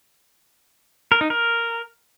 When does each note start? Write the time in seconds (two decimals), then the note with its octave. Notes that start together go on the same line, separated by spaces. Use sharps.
1.12 A#4
1.21 D#4
1.30 A#4